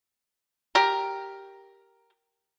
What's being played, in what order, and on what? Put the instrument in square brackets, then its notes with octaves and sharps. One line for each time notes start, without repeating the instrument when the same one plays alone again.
[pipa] G4 A#4